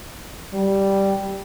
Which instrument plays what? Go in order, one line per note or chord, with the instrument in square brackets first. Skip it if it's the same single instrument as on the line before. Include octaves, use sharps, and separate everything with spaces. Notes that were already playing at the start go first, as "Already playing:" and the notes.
[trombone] G3